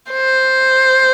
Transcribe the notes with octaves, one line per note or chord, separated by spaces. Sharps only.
C5